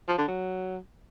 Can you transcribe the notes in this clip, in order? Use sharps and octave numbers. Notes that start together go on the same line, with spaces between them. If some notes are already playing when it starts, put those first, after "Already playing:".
F3
D3
F#3